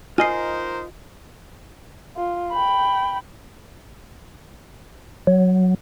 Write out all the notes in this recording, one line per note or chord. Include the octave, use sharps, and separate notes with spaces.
D#4 F4 A#4 C5 D#5 G#5 C7
F4
G5 B5
F#3